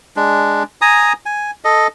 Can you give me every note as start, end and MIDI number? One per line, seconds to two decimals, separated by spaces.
0.16 0.63 56
0.16 0.63 62
0.82 1.13 80
0.82 1.13 82
0.82 1.13 87
1.26 1.51 80
1.65 1.87 69
1.65 1.87 75